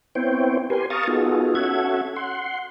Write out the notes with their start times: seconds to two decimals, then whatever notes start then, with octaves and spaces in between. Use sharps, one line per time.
0.15 B3 C4 E4 C5 C#5 G5
0.70 G4 A#4 B4 G#5 C6
0.90 F5 A5 A#5 C#6 D#6 A6
1.08 B3 D#4 F4 F#4 G#4 A4
1.55 C#4 F#4 A4 E5 F#5 G#6
2.16 F#5 C6